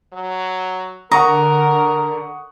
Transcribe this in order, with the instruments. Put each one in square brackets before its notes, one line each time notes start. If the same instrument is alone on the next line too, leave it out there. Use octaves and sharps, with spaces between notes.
[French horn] F#3
[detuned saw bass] D3 [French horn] A#4 [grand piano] F#5 C#6 D#6 [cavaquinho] A#5